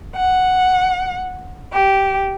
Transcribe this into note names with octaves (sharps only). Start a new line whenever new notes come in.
F#5
G4